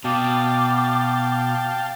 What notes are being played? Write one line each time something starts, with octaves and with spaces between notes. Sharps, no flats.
B2 F5 G5 A5 D6